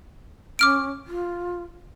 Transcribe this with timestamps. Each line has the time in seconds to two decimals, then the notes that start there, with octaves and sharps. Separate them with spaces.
0.59 C#4 D6 F6 D7
1.06 F4